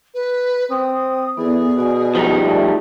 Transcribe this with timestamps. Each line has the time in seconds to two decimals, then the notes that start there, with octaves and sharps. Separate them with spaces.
0.14 B4
0.70 C4 D#6
1.37 E3 B3 G#4 A4 D5
1.77 B2 F#4 D5 G#5
2.15 F3 G3 D#4
2.45 A3 D5